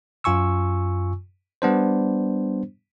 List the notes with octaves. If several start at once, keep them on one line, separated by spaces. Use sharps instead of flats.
F#2 F4 G#5 C#6 E6
G3 B3 D4 C5